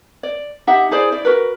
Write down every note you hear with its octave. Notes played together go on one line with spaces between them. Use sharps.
D5
D#4 G4 E5 F#5
E4 G#4 C5 D5
E4 D5
F#4 A#4 B4